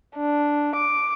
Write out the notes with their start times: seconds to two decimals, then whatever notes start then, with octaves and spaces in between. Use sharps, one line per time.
0.17 D4
0.75 D6